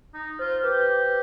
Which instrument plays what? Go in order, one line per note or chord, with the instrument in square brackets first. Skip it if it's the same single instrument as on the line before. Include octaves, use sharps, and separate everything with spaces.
[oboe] D#4
[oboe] F4 [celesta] C5
[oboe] G4 [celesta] B4